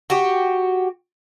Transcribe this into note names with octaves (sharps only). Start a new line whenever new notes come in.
F#4 G4